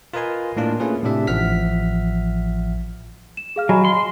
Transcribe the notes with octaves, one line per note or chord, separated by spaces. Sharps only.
F4 A#4 B4 D#5 G#5 C6
A2 A#3 D4 F4
A3 A#3 C#4 F4 G#4 B4
A2 C3 D4 G4 E5
A1 F3 E5 F#5 F6 B6
E7
G#4 F5 F6
F#3 D#5 G#5 B5
C6